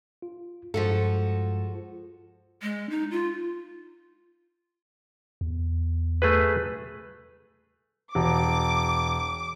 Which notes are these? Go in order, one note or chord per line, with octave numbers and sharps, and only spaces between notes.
F4
G2 F3 G#3 F#4 G#4 A4
G#3
D#4
F4
E2
A3 G#4 B4
E1 D6